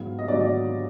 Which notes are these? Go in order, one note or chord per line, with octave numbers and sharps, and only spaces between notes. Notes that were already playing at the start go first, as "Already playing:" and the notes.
Already playing: G#2 F#3 B3 F5
D#5
G#2 F#3 B3 D5
D5